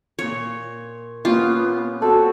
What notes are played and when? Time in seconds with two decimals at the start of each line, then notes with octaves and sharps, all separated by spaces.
0.19 A#2 F4 C#5
1.25 A#3 B3 C#4 F4 G4
2.02 C4 F#4 A4